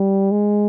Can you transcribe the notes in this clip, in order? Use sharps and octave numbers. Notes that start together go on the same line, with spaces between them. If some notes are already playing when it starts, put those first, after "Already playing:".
Already playing: G3
G#3